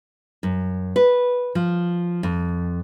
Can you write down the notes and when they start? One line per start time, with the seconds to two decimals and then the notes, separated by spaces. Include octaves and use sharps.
0.43 F#2
0.96 B4
1.55 F3
2.23 F2